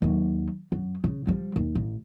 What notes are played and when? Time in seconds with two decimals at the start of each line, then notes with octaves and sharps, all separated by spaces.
0.02 D#2 F#3
0.72 F#2
1.04 C#3
1.27 F3 G3
1.56 D#2
1.75 A1